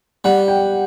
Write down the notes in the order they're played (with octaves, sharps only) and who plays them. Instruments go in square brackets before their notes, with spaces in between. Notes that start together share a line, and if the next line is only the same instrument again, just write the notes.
[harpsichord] G3 [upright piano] F#5
[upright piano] G5